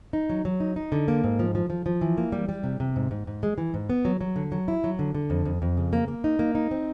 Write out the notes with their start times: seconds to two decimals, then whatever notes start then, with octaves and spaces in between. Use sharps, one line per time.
0.13 D#4
0.30 F#3
0.45 F#3
0.60 D#4
0.76 D#4
0.92 D3
1.08 A#3
1.24 G#2
1.39 F3
1.55 F3
1.70 F3
1.86 F3
2.01 E3
2.18 A#3
2.32 G3
2.49 G3
2.64 C3
2.80 C3
2.96 G#2
3.11 G#2
3.27 G#2
3.43 G#3
3.58 E3
3.74 G#2
3.90 B3
4.05 F#3
4.21 F#3
4.36 D3
4.52 F#3
4.68 E4
4.84 F#3
4.99 D3
5.15 D3
5.30 F2
5.45 F2
5.62 F2
5.77 C#3
5.93 A#3
6.08 A#3
6.24 D#4
6.39 A#3
6.55 D#4
6.71 C4